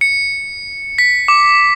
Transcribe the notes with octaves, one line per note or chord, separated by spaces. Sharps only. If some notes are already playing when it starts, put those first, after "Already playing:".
C#7
B6
D6